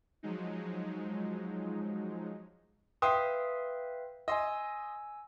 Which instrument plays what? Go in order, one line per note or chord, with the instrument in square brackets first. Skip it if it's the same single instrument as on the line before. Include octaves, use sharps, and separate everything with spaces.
[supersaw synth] F3 F#3 G#3 D#4
[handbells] B4 E5 F5 [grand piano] G5 C6 D#6
[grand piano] D#5 C6 [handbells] G#5 E6